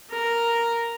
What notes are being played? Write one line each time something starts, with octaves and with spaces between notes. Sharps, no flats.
A#4